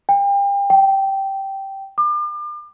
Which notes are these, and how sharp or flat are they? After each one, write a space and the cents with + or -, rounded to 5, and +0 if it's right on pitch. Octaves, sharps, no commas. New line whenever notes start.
G5 +35
G5 -10
D6 +40